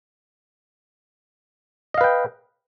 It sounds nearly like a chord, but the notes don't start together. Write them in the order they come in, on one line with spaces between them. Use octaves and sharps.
D#5 F5 B4 G5